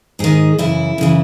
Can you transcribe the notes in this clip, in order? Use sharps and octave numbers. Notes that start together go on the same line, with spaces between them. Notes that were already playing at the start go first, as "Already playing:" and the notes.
G#2 D#3 G#4
F#2 C#3 E3 E4
F#2 C#3 E3